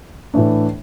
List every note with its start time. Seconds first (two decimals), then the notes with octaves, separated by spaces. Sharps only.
0.34 A2 E3 A3 D4